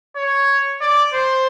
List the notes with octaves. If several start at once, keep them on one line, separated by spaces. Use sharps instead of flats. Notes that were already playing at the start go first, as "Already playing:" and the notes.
C#5
D5
C5